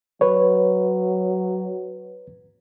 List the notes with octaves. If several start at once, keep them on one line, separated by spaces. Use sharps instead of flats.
F#3 B4 C#5